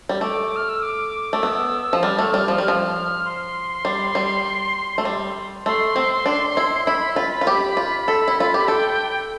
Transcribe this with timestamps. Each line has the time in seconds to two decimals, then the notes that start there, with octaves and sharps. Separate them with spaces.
0.09 G3
0.21 A3 D6
0.56 F6
0.69 E6
0.82 D6
1.33 A3
1.42 B3 E6
1.93 F3
2.03 G3 F6
2.19 A3
2.34 G3
2.48 F3
2.58 G3 F6
2.68 F3
3.24 C6
3.85 G3
4.15 G3
4.98 A3
5.05 G3
5.66 A3 C6
5.96 C4
6.26 D4
6.57 E4
6.86 E4 B5
7.16 F4
7.41 F4
7.47 G4
7.77 F4
8.08 A4
8.28 E4
8.40 F4
8.54 G4
8.68 A4 G5